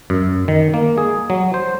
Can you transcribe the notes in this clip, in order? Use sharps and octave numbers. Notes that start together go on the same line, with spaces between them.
F#2
D#3
A#3
G#4
F#3
C5